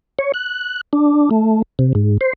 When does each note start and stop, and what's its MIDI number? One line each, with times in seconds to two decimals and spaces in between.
0.19 0.32 73
0.34 0.81 90
0.93 1.29 62
1.31 1.62 57
1.79 1.93 48
1.95 2.18 44
2.21 2.33 72